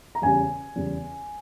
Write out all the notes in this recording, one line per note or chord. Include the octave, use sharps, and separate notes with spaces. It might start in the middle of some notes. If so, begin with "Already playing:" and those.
A#5
E2 C#3 G3 G#5
E2 C#3 G3